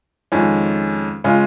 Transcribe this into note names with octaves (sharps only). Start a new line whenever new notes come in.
F2 D#3 G#3 C#4
C#3 G#3 C#4 F4